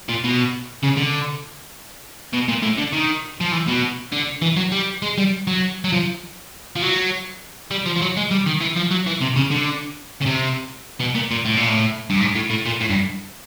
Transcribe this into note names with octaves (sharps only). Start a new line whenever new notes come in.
A#2
B2
C#3
D3
B2
A#2
A2
D3
D#3
F3
E3
B2
D3
E3
F#3
G3
G#3
G3
F#3
F#3
F3
F3
F#3
G3
F3
F3
F#3
G#3
G3
D#3
E3
F3
F#3
E3
C3
C#3
D3
C#3
C3
B2
A#2
A#2
A2
A#2
A2
G2
G#2
A2
A2
A#2
A2
G2